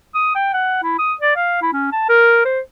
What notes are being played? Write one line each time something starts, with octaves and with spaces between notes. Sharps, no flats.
D#6
G5
F#5
E4
D#6
D5
F5
E4
C#4
A5
A#4
C5